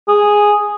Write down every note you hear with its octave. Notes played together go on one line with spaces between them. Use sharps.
G#4